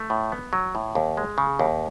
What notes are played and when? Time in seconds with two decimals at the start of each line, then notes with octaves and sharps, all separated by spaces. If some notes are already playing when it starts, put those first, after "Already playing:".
Already playing: A3
0.10 A2
0.32 B3
0.53 F#3
0.75 A2
0.95 D#2
1.17 G#3
1.38 C#3
1.59 D#2